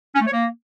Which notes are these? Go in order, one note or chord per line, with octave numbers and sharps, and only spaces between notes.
C#4
A3
C#5
A#3